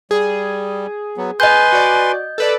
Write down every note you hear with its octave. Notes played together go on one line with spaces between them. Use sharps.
G3 G#4
F#3 B3
B4 D#5 G#5 C6 G6
F#4 D5
A4 B4 D5